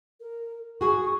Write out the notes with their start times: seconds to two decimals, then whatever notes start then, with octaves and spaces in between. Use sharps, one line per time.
0.20 A#4
0.81 F#4 G#4 C#6